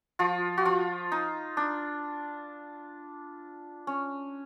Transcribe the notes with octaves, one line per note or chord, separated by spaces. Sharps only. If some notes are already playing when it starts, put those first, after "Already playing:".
F3 F4
F#4
F3 F4
D#4
D4
C#4